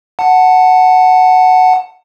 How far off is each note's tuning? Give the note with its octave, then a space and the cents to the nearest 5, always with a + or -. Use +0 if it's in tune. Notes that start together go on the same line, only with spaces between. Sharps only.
F#5 +0 A5 +15